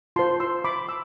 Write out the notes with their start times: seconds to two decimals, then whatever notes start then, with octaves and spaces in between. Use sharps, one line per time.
0.16 F4 A5 C6
0.19 C5
0.40 C6 E6
0.64 B5 D6
0.89 E6